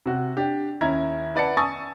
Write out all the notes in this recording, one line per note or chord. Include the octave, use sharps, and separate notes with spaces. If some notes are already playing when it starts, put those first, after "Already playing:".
C3 F#4
D4 G4
D#2 C#4 E4 A#5 G#6
E4 B4 D5 F#5 A5 C#7
G#5 A5 C#6 D#6 E6 A6